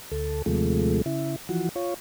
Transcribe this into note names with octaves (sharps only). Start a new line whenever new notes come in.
D2 A4
D#2 C3 F3 G#3 A3
C#3 E4
E3 F3 F#4
F4 C#5